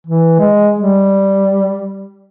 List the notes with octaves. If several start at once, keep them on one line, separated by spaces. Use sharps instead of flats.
E3
G#3
G3